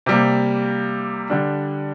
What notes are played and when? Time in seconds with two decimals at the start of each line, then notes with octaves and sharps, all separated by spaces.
0.06 C3 G3 A#3
1.30 D3 G3 D4